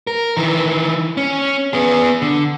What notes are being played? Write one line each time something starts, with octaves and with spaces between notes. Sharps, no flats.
A#4
D#3 E3
C#4
B3 G#4
D3